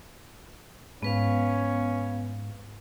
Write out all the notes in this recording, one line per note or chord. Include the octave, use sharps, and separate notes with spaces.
G#2 B3 C#4 B4 F5